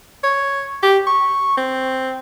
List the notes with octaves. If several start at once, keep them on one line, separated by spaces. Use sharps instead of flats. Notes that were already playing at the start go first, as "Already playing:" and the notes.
C#5
G4
C#6
C4